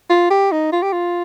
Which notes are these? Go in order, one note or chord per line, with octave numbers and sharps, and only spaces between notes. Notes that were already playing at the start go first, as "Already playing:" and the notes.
F4
G4
D#4
F4
G4
F4